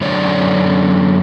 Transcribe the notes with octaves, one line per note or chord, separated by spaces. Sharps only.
F#2 D3 C#5 D5